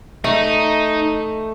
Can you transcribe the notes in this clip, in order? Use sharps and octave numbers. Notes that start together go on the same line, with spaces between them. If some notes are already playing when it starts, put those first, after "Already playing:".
A3 D#4